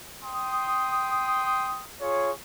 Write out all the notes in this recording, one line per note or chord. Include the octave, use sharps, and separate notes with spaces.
G5 C6 D#6
F4 G#4 C#5